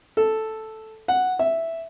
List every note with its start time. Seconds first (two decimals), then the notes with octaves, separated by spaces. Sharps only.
0.17 A4
1.08 F#5
1.39 E5